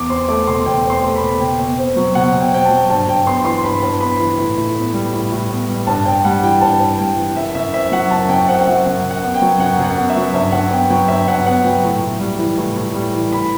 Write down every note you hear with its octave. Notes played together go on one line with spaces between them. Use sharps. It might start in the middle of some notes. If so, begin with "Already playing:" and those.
Already playing: E2 D6
C4 C6
A3 D6
B2 C6
E2 G5
C4
C6
A3
B5
B2
B2 G5
B2
C4
F#3
B2 F#5
B2
G5
C4 G5
A5
F#3
G2 A5
G2 G5
B3 C6
E3 C6
G2 B5
G2
B3 B5
E3
A2
A2
B3
G3
A2
A2
B3
G3
G2 A5
G2 G5
G3 F#5
E3 G5
G2 A5
G2
G3 G5
E3
F#2 E5
F#2 E5
C4 E5
F#3 F#5
F#2 A5
F#2 G5
C4 F#5
F#5
F#3 E5
F#2 F#5
F#2
F#5
B3
G5
F#3
F#2 F#5
F#2
F#5
B3
E5
F#3
G2 E5
G2 F#5
B3 G5
F#3 G5
G2 E5
G2 F#5
B3 F#5
F#3 G5
A2
A2
G3
E3
A2
A2
G3
E3
A2 B5